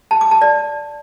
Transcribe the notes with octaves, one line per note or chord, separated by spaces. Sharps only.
A5
D6
A5
D5